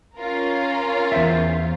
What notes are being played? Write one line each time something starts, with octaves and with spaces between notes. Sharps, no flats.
C#4 F4 A#4
E2 C5 E5